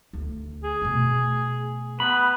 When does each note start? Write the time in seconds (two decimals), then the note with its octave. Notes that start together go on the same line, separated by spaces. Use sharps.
0.13 D2
0.64 G#4
0.82 B2 A3
2.00 B3 B5